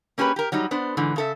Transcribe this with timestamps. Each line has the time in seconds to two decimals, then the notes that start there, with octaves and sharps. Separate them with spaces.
0.18 A#3 C#4 G4 G#4 B4
0.36 G4 A#4
0.52 F#3 G3 D#4
0.71 B3 D4 C5
0.97 G#2 D3 E3
1.16 C#3 A4 E5